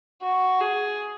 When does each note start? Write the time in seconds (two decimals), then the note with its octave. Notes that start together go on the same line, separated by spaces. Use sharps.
0.22 F#4
0.61 G#4